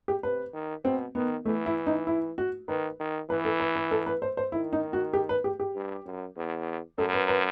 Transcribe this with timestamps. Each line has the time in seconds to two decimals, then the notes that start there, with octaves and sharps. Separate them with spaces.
0.08 G4
0.23 C3 B4
0.53 D#3
0.85 B2 C4
1.15 D#3 B3
1.46 E3 A3
1.66 E4
1.87 D#4
2.07 E4
2.38 F#4
2.68 D#3 B4
3.00 D#3
3.30 E3 B4
3.45 A4
3.60 B4
3.76 B4
3.91 A4
4.06 B4
4.22 C5
4.37 C5
4.52 D#3 E4
4.73 D#4
4.93 F#4
5.13 G4
5.29 B4
5.44 G4
5.60 G4
5.75 G2
6.05 F#2
6.36 E2
6.98 F#2 A4
7.13 B4
7.28 B4